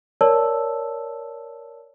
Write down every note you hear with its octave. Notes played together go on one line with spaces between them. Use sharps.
A#4 C#5 D5 A5 E6